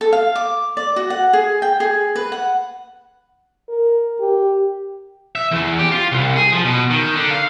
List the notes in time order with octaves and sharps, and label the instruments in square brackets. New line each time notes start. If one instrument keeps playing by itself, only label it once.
[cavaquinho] A4
F5
D6
D5
F#4
F#5
G#4
G5
G#4
B4
F#5
[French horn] A#4
G4
[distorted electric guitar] E5
E2
G4
F4
C2
G#4
F3
B2
D#3
D3
F5